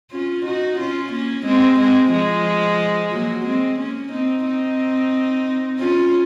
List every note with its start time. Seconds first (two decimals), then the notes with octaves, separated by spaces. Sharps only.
0.12 C#4 F4
0.45 D#4 F#4
0.78 C#4 F4
1.12 A#3 C#4
1.45 G#3 C4
1.78 G#3 C4
2.12 F3 G#3
3.12 F#3 A#3
3.45 G#3 C4
3.79 A#3 C#4
4.12 C4 D#4
4.46 C4 D#4
5.79 C#4 F4